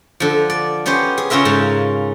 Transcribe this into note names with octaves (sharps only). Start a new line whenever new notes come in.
D3 F3
D5
B3 C#4 G4 C5
G#4
C#3 C#4 F4 A#4 E5
G#2 C#3